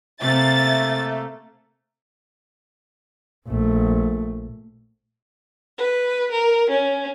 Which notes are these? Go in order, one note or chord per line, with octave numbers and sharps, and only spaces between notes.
C3 A3 A#3 E5 A6
A#1 A3
B4
A#4
C#4